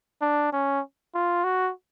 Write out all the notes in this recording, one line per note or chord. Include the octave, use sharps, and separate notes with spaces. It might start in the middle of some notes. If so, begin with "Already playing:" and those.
D4
C#4
F4
F#4